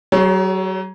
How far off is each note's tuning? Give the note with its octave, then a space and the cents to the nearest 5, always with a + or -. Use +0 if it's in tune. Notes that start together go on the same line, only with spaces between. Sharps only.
F#3 +35 G#4 +0 C#5 +0